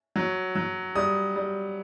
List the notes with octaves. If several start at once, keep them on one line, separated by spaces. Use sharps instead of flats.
F#3
F#3
G3 D#6
G3